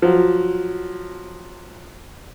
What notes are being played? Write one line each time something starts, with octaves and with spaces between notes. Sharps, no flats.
F3 F#3